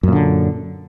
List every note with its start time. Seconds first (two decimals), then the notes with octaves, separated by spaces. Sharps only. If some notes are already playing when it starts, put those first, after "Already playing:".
0.03 F#2
0.08 A#2
0.13 D3